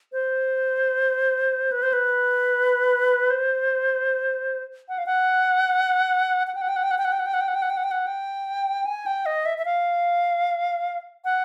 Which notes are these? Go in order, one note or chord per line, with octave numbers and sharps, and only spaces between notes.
C5
B4
C5
B4
C5
F#5
F5
F#5
F#5
G5
F#5
G5
F#5
G5
F#5
G5
F#5
G5
F#5
G5
F#5
G5
F#5
G5
F#5
G5
F#5
G5
F#5
G5
G#5
G5
D#5
E5
E5
F5
F#5